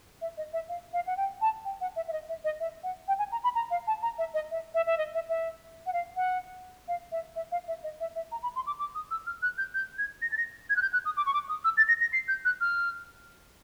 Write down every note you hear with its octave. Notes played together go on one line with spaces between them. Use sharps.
E5
D#5
E5
F5
F5
F#5
G5
A5
G5
F#5
E5
E5
D#5
E5
D#5
E5
F#5
G5
G#5
A#5
B5
A#5
F5
A5
A#5
E5
D#5
E5
E5
E5
D#5
E5
E5
F#5
F5
F#5
F5
E5
E5
F5
E5
D#5
E5
E5
A#5
B5
C6
D6
D6
D#6
E6
F6
F#6
G6
G6
G#6
A#6
A6
A#6
G#6
F#6
G6
F#6
D#6
D6
C#6
D6
D#6
E6
A6
A#6
A#6
C7
G6
F#6
F6